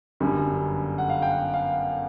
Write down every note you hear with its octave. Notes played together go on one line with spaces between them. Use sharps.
G1 F#2 D3 G3
F#5
F5
G5
F#5
F5